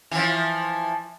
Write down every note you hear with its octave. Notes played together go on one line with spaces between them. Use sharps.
E3 F3